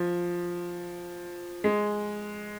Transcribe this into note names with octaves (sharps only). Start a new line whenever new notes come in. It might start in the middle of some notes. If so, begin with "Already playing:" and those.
Already playing: F3
G#3